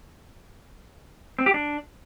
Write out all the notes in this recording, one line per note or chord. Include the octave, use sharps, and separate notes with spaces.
C4
G4
D4